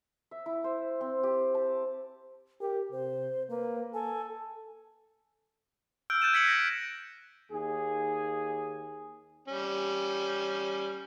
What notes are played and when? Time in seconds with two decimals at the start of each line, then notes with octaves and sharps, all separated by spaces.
0.31 E5
0.46 E4
0.64 C5
1.01 C4
1.23 G4
1.55 A5
2.61 G4 A#4
2.92 C3 C5
3.50 A#3 B4
3.94 A4 G#5
6.10 E6 F6 G6 D7
6.22 E6 F#6 G6 A6 D#7 E7
6.33 G#6 B6 C#7 F#7
6.48 A#6
7.52 D#2 G#4
9.48 G3 C#4